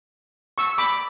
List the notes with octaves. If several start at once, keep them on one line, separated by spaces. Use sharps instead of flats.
C#6 E6
B5 D6